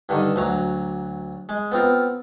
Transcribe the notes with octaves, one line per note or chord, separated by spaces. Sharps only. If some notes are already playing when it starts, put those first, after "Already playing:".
G2 D3 D#3
D2 F#3 A#5
G#3
B3 C4 F4 A#4